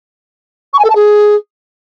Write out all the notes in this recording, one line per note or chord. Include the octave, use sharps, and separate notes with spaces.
C#6
G#5
A4
A5
G#4